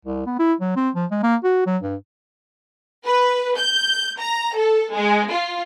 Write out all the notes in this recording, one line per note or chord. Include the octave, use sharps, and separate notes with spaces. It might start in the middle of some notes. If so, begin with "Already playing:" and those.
C2
B3
E4
F#3
C4
F3
G#3
A#3
F#4
F#3
G2
B4
G6
A#5
A4
G#3
F4